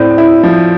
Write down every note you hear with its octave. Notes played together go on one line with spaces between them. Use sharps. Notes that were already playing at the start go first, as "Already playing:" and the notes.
Already playing: A2 C4 D5
E4
F3